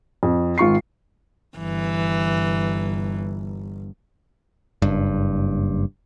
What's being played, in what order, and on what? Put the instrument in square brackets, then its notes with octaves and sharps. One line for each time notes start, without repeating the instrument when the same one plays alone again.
[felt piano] F2
G#1 F4 C#6 C7
[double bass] G1 [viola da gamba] E3
[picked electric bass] F#1 G2